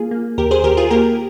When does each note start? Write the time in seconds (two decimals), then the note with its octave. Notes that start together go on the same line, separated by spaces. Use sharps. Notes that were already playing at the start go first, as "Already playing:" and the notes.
Already playing: A#3 F4 G#4
0.11 A#3
0.38 D#2 G4 A#4
0.51 G#4 C5
0.64 D#2 G4 A#4
0.77 F4 G#4
0.90 A#3 G4 A#4